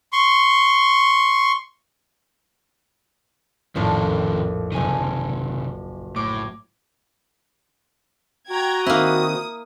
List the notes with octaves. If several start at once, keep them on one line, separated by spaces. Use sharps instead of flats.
C6 C#6
A#1 F2 A2 D#3 C#4 F4
F#1 C3 D#3 G#5 D#7
A2 D6 G#6
F#4 G5 A#5 G#6
D#3 A#3 C4 E4 D#6